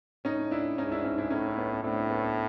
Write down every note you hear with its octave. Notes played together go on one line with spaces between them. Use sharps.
A2 C#4 D#4
D4 E4
G#2 C#4 D#4
D4 E4
C#4 D#4
D4 E4
A2 C#4 D#4
B3 C#4
A2 C4 D4
B3 C#4